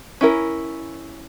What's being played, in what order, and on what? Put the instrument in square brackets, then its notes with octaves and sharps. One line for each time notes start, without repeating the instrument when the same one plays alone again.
[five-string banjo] C#4 E4 A#4